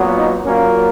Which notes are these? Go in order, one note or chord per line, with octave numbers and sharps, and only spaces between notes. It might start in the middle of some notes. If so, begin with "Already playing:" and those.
Already playing: A#2 F#3 B3
D#4
A#2 F#3 A#3 C#4